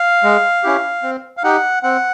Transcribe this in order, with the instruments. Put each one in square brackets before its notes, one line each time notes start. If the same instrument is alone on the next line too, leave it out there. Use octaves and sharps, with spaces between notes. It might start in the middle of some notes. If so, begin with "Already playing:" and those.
Already playing: [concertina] F5
G#3
C#4 E4 G4
C4
F5
D#4 G4 F#5
C4 F#5